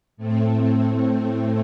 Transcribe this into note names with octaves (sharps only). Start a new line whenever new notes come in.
A2 A3 C4